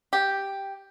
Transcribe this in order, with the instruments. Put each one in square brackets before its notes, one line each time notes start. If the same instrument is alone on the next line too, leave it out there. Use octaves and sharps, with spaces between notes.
[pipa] G4